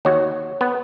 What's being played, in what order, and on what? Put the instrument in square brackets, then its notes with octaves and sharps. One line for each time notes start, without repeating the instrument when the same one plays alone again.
[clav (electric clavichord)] D#2 F#4 [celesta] C#5
[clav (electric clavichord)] B3